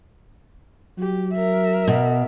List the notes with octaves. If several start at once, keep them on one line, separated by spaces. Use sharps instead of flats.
F#3 G4
A#4 E5
B2